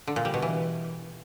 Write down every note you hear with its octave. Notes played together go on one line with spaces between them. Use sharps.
D3
A#2
G3
B2
E3